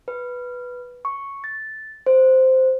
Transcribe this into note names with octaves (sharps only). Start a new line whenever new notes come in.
B4
C#6
A6
C5